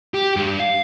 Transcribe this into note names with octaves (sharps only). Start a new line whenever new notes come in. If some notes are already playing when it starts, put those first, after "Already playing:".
G4
G2
F5